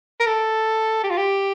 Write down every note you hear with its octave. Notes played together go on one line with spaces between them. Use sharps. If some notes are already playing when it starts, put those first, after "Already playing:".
A#4
A4
G4
F4
G4